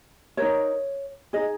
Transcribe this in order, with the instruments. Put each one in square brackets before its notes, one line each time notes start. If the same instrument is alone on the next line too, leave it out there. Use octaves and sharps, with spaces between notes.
[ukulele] D#4 A#4 C#5
D#4 G#4 D#5